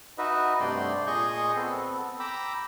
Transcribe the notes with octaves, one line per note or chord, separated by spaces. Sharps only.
D#4 F#4 B4 D#5 E5
G2 C3 A3 D5 G5 C6
A#2 G#4 D#5 C6 C#6 G6
B3 C4 A4
G5 A#5 B5 D6 E6